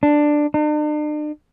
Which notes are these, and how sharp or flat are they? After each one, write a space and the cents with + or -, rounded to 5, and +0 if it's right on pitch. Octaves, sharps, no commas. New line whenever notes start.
D4 +10
D4 +45